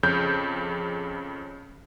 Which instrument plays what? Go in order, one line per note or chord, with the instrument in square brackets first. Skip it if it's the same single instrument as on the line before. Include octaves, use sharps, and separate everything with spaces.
[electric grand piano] F2 C#3 G6